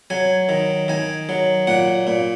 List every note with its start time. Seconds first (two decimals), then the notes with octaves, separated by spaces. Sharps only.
0.10 F#3 G#5
0.49 D#3
0.88 D#3 G#5
1.29 F#3
1.67 A#2 F#5
2.07 A#2